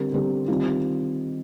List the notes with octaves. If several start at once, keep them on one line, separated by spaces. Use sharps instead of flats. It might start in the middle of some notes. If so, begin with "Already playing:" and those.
Already playing: D3 G3 C4 G4 A#4
D3 G3 C4 G4 A#4
D#3 G3 C4 F4